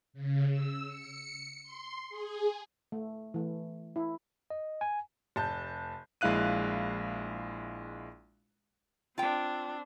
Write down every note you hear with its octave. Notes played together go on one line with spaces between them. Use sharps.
C#3
E6
C#7
C6
G#4
A3
E3 A3
E4
D#5
G#5
F1 A5 G6
A#1 G#3 E4 F5 F#6 D#7
C4 D4 F4 G5